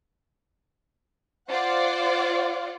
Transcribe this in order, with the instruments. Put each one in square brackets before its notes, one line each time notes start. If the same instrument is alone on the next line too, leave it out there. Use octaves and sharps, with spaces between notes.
[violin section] F4 C5 D5 F#5